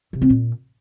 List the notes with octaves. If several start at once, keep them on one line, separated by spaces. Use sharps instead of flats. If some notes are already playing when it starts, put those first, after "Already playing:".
C3
C4
A#2